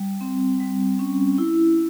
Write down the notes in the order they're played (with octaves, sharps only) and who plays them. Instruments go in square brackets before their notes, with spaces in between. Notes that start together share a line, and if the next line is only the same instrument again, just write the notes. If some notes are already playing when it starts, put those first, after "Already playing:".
Already playing: [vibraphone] G3
C4
G3
C#4
E4